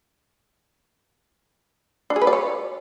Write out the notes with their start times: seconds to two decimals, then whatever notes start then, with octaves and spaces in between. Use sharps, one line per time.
2.10 D4
2.16 G#4
2.22 B4
2.27 D5
2.33 C#5